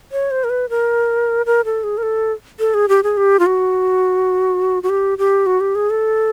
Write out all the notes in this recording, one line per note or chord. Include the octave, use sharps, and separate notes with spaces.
C#5
C5
A#4
B4
A#4
A#4
A4
G#4
A#4
A4
A4
G#4
G4
G#4
G4
F4
F#4
F#4
G4
G4
F#4
G4
G#4
A4